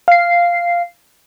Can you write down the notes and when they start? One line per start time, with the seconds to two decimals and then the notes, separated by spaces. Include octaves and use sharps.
0.08 F5 C7